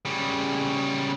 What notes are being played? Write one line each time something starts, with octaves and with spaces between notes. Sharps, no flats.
C#3 G3